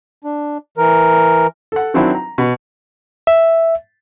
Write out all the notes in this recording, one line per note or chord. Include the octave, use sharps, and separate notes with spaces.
D4
E3 A#4
A4 F#5
D#3 F#3 C4 D4 E4
A#5
B2
E5